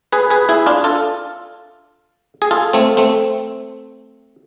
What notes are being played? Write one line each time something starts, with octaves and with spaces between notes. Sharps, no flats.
G#4 B4
G#4 B4
E4 G#4
D4 F4
F4 A4
G#4
F4 A4
A3 C4
A3 C4